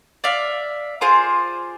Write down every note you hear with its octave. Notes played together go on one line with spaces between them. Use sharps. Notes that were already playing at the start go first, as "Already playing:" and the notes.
D5 E5 F5
F4 G#4 C5 D6